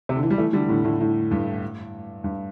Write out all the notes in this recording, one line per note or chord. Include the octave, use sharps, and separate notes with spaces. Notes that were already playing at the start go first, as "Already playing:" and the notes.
C3
D3
E3
G3
E3 A3
D3 G3
A2 D3
A2 D3
A2
G2
G2